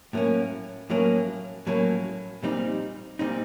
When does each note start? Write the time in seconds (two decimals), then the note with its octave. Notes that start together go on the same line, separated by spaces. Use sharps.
0.13 A2 F#3 A#3 C#4
0.90 A2 F#3 A#3 C#4
1.67 A2 F#3 A#3 C#4
2.43 A#2 G3 C4 D#4
3.19 A#2 G3 C4 D#4